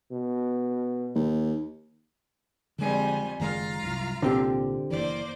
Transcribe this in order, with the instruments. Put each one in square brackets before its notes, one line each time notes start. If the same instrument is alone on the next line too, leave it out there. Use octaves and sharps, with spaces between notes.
[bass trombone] B2
[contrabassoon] D#2
[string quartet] F2 G3 G#5 [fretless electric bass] D3 G#3
[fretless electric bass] F#1 D#3 G#3 [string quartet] F4 F5 A#5
[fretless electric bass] C2 F#2
[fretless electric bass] C2 A#2 [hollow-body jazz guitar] D3 C4 G4
[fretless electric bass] F#1 C#2 E3 [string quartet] A#3 C5 D5